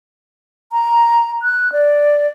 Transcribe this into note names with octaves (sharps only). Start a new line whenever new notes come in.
A#5
F#6
D5